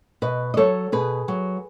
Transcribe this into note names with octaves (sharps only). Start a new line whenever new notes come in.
B2 B4 D#5
D#5
F#3 A4 C#5
B2 G#4 B4
F#3